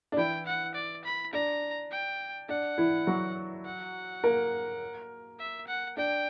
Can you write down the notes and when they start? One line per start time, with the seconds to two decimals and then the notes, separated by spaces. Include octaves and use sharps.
0.12 D4
0.17 E3 E4 G5
0.46 F#5
0.75 D5
1.05 B5
1.33 D4 A#5
1.91 G5
2.49 D4 F#5
2.78 E3 E4
3.07 F#3 F#4
3.66 F#5
4.23 A#3 A#4
5.40 E5
5.67 F#5
5.97 D4 G5